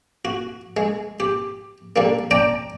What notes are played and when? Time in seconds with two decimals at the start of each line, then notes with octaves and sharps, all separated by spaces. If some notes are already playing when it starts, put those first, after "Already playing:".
0.25 F#4
0.77 G#3
1.20 G4
1.96 D3 G3 A#3
2.31 D5 G5 A5 A#5